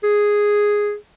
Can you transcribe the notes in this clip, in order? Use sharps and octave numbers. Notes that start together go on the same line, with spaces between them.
G#4